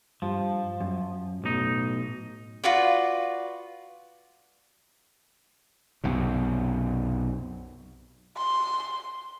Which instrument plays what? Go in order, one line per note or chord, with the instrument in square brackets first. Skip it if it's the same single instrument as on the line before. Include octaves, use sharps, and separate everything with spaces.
[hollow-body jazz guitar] G2 [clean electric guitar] F3
[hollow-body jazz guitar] F#2
[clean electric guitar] B1 D#4 [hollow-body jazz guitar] A2
[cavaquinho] F4 F#4 B4 D5
[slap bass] B1 F#2 C3
[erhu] C6